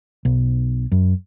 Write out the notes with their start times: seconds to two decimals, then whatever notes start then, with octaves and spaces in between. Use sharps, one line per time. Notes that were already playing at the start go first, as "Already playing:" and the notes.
0.25 B1
0.92 F#2